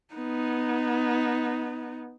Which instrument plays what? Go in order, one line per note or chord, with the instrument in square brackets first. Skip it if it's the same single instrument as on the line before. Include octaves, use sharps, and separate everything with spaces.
[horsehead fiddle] B3 D#4